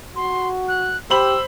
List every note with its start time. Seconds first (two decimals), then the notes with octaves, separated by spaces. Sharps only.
0.16 F#4 C6
0.68 F#6
1.10 G4 C5 B5 E6 F#7